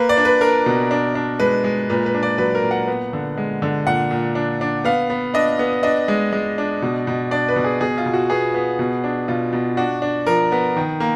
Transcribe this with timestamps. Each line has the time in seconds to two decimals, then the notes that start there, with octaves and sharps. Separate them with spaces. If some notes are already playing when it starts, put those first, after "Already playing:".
Already playing: A#3 B4
0.09 D5
0.17 D4
0.25 B4
0.41 D4 A#4
0.66 B2
0.91 D4
1.15 D4
1.40 G#3 B4
1.64 G#3
1.89 A#2 B4
2.06 B4
2.14 D4
2.23 D5
2.38 F#3 B4
2.55 A#4
2.63 A#2
2.71 F#5
2.87 B3
3.13 D3
3.37 G#3
3.62 D3
3.87 A#2 F#5
4.11 A#2
4.35 D4
4.61 D4
4.85 B3 F5
5.10 B3
5.34 D4 D#5
5.59 B3
5.83 D4 D#5
6.08 G#3
6.33 G#3
6.58 D4
6.82 B2
7.07 B2
7.31 D4 D5
7.48 B4
7.56 B2
7.64 G#4
7.81 B2 G#4
7.98 F4
8.06 B2
8.13 F#4
8.30 B3 G#4
8.54 B3
8.79 B2
9.04 D4
9.28 B2 F4
9.53 B2
9.77 D4 F#4
10.02 D4
10.27 F3 A#4
10.52 B3
10.76 D#3
11.00 A#3